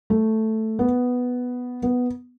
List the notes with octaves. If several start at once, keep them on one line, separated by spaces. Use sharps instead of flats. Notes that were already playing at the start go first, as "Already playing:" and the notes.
A3
B3
B3